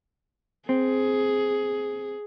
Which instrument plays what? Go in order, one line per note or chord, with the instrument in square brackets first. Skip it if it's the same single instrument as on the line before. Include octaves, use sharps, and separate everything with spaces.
[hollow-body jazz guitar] C4 [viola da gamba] G#4